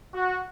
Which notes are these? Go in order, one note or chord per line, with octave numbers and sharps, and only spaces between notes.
F#4